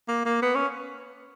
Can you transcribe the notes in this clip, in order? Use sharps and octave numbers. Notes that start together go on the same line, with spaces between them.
A#3
A#3
B3
C#4